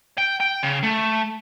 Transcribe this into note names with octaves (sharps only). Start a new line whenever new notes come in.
G5
G5
C#3
A3